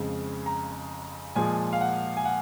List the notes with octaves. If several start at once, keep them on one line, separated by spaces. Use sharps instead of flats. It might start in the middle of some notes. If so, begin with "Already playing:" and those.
Already playing: F2 C#3 G#3 C4
A#5
A#2 F3 G#3 G#5
F5
F#5
G#5
F#5